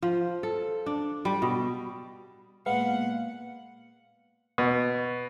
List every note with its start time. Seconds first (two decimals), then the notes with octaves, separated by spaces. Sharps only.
0.02 F3
0.43 A4
0.86 D4
1.25 G3
1.42 B2
2.66 A#2 G#3 B3 F5 F#5
4.58 B2